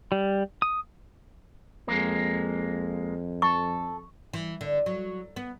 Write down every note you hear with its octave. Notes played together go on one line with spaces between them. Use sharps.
G3
D#6
F2 G#3 A#3
A4 C#6
E3
D3
F#3
B3